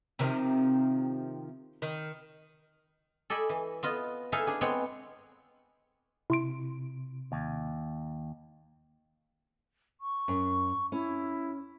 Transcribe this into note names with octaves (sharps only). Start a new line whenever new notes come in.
C3 D#3 F3
D#3
A4 D5 D#5 G#5 B5
E3
B3 F4 D#5
D#4 E4 G#4 A4 E5 F5
D4 G#4
G#3 B3 C4 C#5 G5
C3 E4 C6 D7
D#2
C#6
F#2
C#4 E4